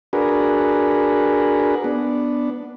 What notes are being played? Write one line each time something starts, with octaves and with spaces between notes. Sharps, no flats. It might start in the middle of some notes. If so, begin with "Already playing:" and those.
D4 F#4 G#4 A#4 B4
B3 D4